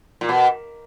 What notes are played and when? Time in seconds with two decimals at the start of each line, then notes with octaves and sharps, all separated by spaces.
0.21 A#2
0.29 B2